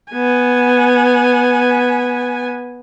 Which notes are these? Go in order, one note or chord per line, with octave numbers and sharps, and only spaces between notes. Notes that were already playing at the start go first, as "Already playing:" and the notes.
B3 G#5